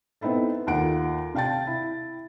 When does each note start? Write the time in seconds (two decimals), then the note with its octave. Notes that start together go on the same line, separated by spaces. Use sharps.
0.21 B3 C4 D#4 E4 A4
0.67 D#2 F4 A4 F#5 D7
1.34 C3 F5 G5 A5 A6
1.67 E4